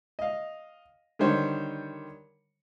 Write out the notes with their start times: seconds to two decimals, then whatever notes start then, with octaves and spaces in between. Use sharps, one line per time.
0.19 D#5 F5
1.19 D3 D#3 G3 C5 C#5